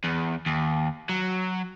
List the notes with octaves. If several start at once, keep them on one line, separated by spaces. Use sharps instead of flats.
E2
D#2
F#3